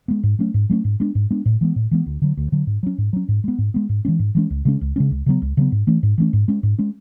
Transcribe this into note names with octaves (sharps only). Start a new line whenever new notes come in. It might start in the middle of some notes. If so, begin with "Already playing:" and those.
G#3 B3
G#2
F#3 A3 C#4
G#2
F#3 A3 C#4
G#2
G#3 B3 D4
G#2
G#3 B3 D4
A2
E3 G#3 B3
A2
E3 G#3 B3
D2
D3 F#3
D2
D3 F#3
G#2
F#3 C#4
G#2
F#3 C#4
G#2
G#3 B3
G#2
G#3 B3
G#2
E3 G#3 C#4
G#2
E3 G#3 C#4
C#2
C#3 G#3 C#4
C#2
C#3 G#3 C#4
C#2
C#3 F#3 B3
C#2
C#3 F#3 B3
G#2
E3 A3 C#4
G#2
E3 A3 C#4
G#2
G#3 C#4
G#2
G#3 C#4